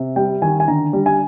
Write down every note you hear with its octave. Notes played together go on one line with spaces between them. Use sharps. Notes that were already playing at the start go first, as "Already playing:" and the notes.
Already playing: C3
G3 G5
D#3 G#5
G#5
D3 A#5
G3
G#5